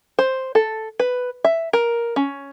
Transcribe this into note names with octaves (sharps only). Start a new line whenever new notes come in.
C5
A4
B4
E5
A#4
C#4